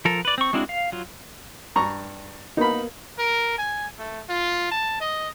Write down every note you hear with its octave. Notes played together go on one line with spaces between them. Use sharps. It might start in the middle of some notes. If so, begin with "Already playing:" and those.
F3 A4 A#4
B4 D5
C4 C#6
G#3 C4 D4 E4 F#4
F5
F#3 F4
G2 A#5 C#6
A#3 B3 D#4 A#4 B5
A#4
G#5
A3
F4
A5
D#5